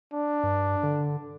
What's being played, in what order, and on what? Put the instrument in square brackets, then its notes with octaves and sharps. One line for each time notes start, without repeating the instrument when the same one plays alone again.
[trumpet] D4
[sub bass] G2
D3